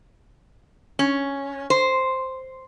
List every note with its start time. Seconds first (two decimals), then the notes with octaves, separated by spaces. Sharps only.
0.99 C#4
1.70 C5